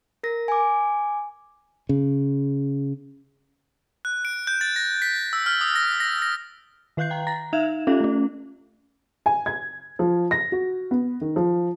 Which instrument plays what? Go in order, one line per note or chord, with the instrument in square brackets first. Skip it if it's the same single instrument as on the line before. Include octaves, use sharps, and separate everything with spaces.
[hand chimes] A#4 A#6
G#5 D6
[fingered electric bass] C#3
[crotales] F#6
D7
G6
A6
A#6
B6
E6
F6
D#6
A#6
A#6
A#6
[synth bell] D#3 B4 F5 F#6 G6 C7
F5 G5 A#5
A#5 A6 A#6
D#4 E5 F5 G#6 E7
C#4 F4 G4 A4 E5 F5
A3 C#4
[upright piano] G#5
G#6
F3
A#6
F#4
B3
D#3
F3